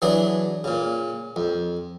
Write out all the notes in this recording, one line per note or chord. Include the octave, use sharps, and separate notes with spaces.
E3 F#3 D4 G#4
A#2 C#3
F2